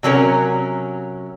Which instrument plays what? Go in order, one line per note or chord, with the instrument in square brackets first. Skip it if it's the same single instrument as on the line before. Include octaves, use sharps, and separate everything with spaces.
[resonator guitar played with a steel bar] C3 F#3 C#4 A#4